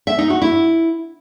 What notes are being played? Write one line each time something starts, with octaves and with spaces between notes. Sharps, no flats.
E5
D#4
F#4
E4